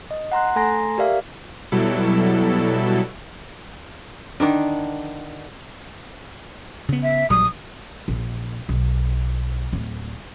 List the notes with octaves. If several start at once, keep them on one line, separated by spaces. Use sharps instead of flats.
D#5
F#5 A#5 C6 F#6
A3 A4 G#5 A#5 C6 A#6
G4 A#4 D5 E5 F5
B2 F#3 G3 E4 A4
D3 D#3 D4
C#3 B3
E5
A#1 F#3 G3 D#6
A#1
B1
D1 D3